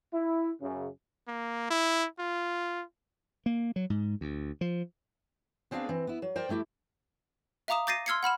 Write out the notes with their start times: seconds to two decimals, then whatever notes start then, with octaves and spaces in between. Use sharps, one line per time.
0.14 E4
0.62 F#2 C#3
1.28 A#3
1.70 E4
2.19 F4
3.46 A#3
3.76 F#3
3.90 G#2
4.21 D2
4.61 F3
5.71 B3 C4 D4 G#4 F5
5.89 E3 C4
6.07 B3 E4
6.22 F#3
6.36 A#4 C5 D5 G5
6.49 D3 A3 E4 G4
7.68 E5 F5 A#5 D6 D#6 E7
7.87 D6 G6 A6 A#6 C7 D#7
8.06 C6 E6 F6 G#6 C7 C#7
8.23 F#5 B5 F6 E7